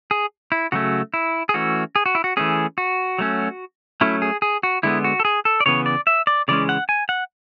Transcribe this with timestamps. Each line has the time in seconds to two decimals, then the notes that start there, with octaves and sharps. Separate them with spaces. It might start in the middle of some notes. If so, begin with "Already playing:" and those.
0.11 G#4
0.52 E4
0.72 C#3 F#3 A3 C#4 F#4
1.14 E4
1.49 G#4
1.54 E3 A3 C#4 F#4
1.96 G#4
2.06 F#4
2.15 E4
2.24 F#4
2.37 E3 A3 C#4 G#4
2.78 F#4
3.19 F#3 A3 C#4
4.01 F#3 A3 C#4 E4
4.22 G#4
4.42 G#4
4.63 F#4
4.83 D3 G#3 B3 E4
5.04 F#4
5.20 A4
5.25 G#4
5.45 A4
5.60 D5
5.66 C#3 E3 B3 C#5
5.86 D5
6.07 E5
6.27 D5
6.48 C#3 E3 G#3 C#4 D5
6.69 F#5
6.89 G#5
7.09 F#5